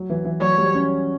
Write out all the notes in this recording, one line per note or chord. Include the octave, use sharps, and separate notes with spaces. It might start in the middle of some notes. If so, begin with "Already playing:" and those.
Already playing: F#3
E3
E3
F#3 C#5
G3
C#4